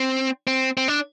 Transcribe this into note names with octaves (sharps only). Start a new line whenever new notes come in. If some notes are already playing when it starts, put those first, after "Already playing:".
Already playing: C4
C4
C4
D4